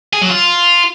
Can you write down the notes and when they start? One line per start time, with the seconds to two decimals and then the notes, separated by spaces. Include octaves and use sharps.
0.13 G#4
0.21 F#3
0.30 F4